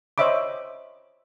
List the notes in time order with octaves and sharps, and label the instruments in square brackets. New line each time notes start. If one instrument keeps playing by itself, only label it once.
[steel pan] C5 C#5 D#5 E5 B5 D6